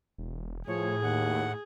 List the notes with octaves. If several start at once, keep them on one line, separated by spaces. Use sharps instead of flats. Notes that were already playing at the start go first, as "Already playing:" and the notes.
E1
A2 F3 G#4 C#5
D#2 F#5